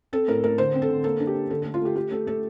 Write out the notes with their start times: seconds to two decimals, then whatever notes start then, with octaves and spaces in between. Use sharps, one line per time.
0.13 C4 A4
0.28 A2 A#4
0.44 A2 A#4
0.58 D3 C5
0.74 C4
0.82 A4
0.89 D3
1.04 A#3 A4
1.20 D4
1.27 G4
1.35 D4
1.50 D3 A4
1.62 A4
1.65 A3
1.74 F4
1.81 A3 G4
1.96 A3 G4
2.11 A3 A4
2.27 A3 A4